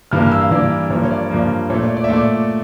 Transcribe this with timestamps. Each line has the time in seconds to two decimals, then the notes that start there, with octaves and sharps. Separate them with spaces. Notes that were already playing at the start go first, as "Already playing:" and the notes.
0.11 G2 E3 A#3 F6
0.22 F6
0.32 E6
0.41 F5
0.51 G2 E3 A#3 D5
0.90 G2 F3 A#3 C#5
1.05 C#5
1.11 D5
1.30 G2 F3 A#3 D5
1.70 A#2 C#5
1.74 A3
1.83 D5
1.97 D5
2.04 E5
2.09 A#2 A3 D5